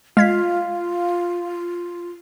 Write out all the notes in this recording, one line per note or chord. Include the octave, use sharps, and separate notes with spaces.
G#3 F4 F5 G#6 B6